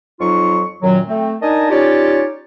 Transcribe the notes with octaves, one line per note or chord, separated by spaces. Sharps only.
F2 F#3 D#4 F4 C#6
F#2 A#2 D#3 F#3
A3 C4
D4 D#4 A#4 D#5 G#5 A5
C#4 D#4 F4 G4 C#5 D5